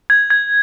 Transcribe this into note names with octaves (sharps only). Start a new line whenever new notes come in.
G#6
G#6